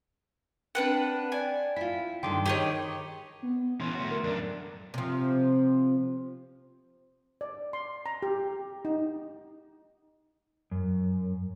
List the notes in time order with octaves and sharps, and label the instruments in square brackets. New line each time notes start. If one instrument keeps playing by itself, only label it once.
[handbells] C4 G5 [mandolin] D4 B4 F#5
[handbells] D5 G5 [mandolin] G#5
[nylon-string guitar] E4 F4 [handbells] B6
[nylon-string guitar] G2 D3 D#3 [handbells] G5 C6 D6
[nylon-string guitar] D#3 C#5 [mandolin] G4 G#4 D#5
[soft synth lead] B3
[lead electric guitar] E3 C#4 [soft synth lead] C6
[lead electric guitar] A3 F#4
[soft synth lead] A#4
[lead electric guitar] F#2 D4
[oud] C3 F3
[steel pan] D5
C6
A#5
G4
D#4
[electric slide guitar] F#2